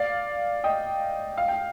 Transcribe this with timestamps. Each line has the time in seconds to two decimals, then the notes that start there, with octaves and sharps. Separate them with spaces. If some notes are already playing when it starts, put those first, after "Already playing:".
Already playing: D5 F5
0.64 D#5 G5
1.38 F5
1.48 G5